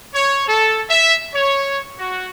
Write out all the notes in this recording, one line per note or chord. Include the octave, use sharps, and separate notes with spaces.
C#5
A4
E5
C#5
F#4